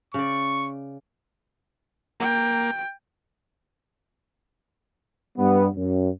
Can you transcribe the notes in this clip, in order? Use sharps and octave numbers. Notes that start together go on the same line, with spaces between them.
C#3 D5 C#6
A#3 G5
G2 G3 B3
F#2